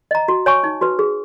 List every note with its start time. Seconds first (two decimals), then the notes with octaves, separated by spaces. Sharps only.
0.11 D#5 A#5
0.28 F#4
0.46 C#5 G#5 C#6
0.63 D#4
0.81 F#4 B4
0.99 G#4